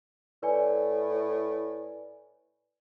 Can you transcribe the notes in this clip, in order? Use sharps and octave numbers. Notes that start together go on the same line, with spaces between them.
A2 B4 D5 G#5